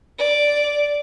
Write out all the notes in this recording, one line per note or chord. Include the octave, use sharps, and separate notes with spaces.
D5